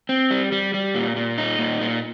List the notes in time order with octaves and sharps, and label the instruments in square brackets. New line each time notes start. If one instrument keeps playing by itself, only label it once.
[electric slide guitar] C4
G3
G3
G3
A#2
A#2
D#4
A#2
A#2